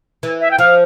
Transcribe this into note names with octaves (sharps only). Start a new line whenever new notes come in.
E3
E5
G5
F3 F5